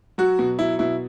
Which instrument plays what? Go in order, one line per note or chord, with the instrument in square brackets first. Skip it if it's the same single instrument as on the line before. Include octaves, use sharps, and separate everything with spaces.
[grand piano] F#3 F#4
B2
F#3 E4
B2 E4